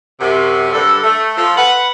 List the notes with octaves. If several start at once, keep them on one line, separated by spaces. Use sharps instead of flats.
F#2 C3
G2 D3 A4
A3
F3 A4
B4 F#5